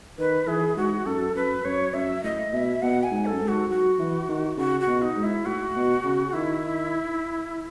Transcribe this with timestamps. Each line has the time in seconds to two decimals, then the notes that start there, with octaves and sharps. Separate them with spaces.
0.18 D#3 B4
0.47 E3 G#4
0.76 G#2 F#4
1.06 F#2 A4
1.35 F#2 B4
1.65 F#2 C#5
1.94 F#2 E5
2.23 A2 D#5
2.53 B2 E5
2.82 B2 F#5
3.03 G#5
3.11 G#2
3.26 A4
3.32 F#2
3.41 G#2
3.48 F#4
3.69 F#3 F#4
3.99 E3
4.29 D#3
4.57 C#3 F#4
4.80 F#4
4.87 B2
5.02 D#4
5.16 G#2
5.23 E4
5.46 A2 F#4
5.75 B2
6.04 C#3
6.33 D#3 E4